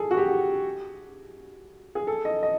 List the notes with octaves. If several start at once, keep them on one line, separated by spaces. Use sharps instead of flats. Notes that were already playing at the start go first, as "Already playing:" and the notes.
Already playing: G#4 A4
F#4
G4
G#4
A4
D#5
D#5